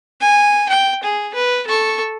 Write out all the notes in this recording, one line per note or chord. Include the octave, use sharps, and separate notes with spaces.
G#5
G5
G#4
B4
A4 C#6